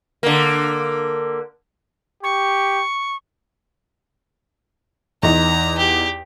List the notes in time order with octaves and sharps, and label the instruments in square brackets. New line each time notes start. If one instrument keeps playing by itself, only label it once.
[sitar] D3 A#3
[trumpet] G4 [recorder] C#6
[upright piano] E2 D#4 [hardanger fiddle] A#5
[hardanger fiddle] G4